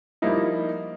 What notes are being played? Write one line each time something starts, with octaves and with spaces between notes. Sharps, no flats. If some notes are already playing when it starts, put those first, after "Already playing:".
F3 G3 A#3 D#4 E4